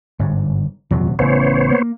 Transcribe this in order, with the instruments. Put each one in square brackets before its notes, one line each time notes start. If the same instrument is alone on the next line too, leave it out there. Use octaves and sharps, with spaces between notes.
[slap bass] G1 G#2
[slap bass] D#1 C3 F#3 [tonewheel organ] F2
[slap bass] A1 C#3 [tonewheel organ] B3 C5 C#5
[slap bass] A#3